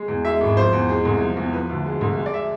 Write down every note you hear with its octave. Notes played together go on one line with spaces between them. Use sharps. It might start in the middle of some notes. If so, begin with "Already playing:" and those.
Already playing: G#3
E2
G#3 E5
G#1
F3 C5
E2
G#3
C2
F3
E2
F3 B4
D2
G#3
C2
G#3
D5
E5